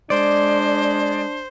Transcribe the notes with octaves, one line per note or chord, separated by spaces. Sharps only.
G#3 D4 C5 D5